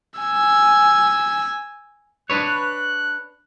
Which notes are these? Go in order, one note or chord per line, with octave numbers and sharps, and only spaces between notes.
G#5 E6
D4 B4 C#5 F#6